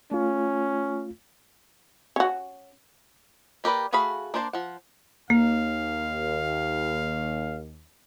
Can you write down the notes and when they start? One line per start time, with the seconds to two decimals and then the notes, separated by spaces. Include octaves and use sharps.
0.11 A3 C#4 F4
2.16 C#4 F#4
3.64 A#3 G4 A#4 B4 D5
3.93 A3 F#4 G#4 F5 B5
4.34 A#3 D4 C5 C#5 A5
4.53 F3 F#5
5.30 D#2 A#3 F5